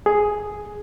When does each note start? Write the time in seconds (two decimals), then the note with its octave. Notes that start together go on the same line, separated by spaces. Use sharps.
0.06 G#4